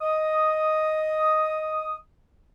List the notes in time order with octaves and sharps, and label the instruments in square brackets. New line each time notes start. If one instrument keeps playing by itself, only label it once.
[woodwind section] D#5 D#6